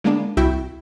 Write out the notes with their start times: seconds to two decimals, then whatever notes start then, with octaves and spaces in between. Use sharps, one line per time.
0.04 D3 G#3 A#3 B3 D4
0.37 C2 E4 F#4 E5 G5